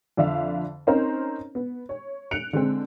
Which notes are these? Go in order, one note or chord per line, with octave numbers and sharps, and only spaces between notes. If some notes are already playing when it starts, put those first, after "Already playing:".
F2 D3 D5 E5 F5
C4 C#4 D#4 A#4 C5 A#5
B3
C#5
F#6 C#7 D7 F7
D3 G#3 C4